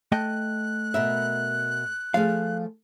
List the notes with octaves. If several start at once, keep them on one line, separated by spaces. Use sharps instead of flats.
A3 D#5 G5 F#6
B2 A#4 E5
F3 A3 G#4 F5